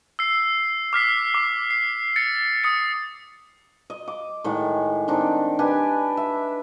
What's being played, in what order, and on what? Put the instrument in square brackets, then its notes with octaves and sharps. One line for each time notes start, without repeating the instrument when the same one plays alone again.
[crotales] E6 C7
D6 F6 B6 C7
D6
C7
A6 C#7
D#6 C#7
[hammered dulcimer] D#5
D6
A2 D#3 G#3 F#5
D#3 C4 D4 D#4
D4 G4 B4 G#5
E5